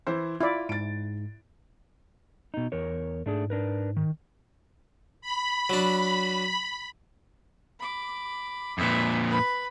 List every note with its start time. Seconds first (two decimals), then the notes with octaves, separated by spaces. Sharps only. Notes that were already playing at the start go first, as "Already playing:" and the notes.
0.07 E3 E4 C5
0.41 E4 F4 D5
0.69 G#2 A6 D7
2.54 B2 D#4
2.72 E2 A#4 C#5
3.26 G#2 A3 D4 G#4
3.50 D4 A#4 B4
3.97 D#3
5.21 B5
5.70 F#3 D4
7.79 B5 D6
8.78 F2 A#2 B4 E5
9.29 B4 B5